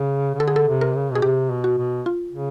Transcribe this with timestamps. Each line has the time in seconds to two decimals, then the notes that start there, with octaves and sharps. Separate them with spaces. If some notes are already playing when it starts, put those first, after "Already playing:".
Already playing: C#3
0.34 C#3
0.39 D3 A4
0.48 G#4
0.56 A4
0.67 C3
0.81 A#4
0.95 C#3
1.11 B2 G#4
1.22 C3 G4
1.50 B2
1.64 F#4
1.78 B2
2.06 F4
2.32 C#3